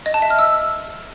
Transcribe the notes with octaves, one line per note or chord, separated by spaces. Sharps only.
D#5
A5
E5
F6
E6